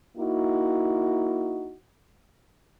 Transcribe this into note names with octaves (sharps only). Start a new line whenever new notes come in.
A#3 D#4 E4 F#4